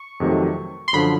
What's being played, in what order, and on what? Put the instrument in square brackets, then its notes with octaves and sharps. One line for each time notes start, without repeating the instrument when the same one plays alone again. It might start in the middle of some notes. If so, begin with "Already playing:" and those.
Already playing: [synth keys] C#6
[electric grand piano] F2 C3 D#3 F#3 A3
[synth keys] C6
[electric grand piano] F#2 D3 F3 [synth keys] B5